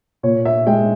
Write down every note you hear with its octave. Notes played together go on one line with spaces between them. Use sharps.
A#2 C#5
E5
G#3 G5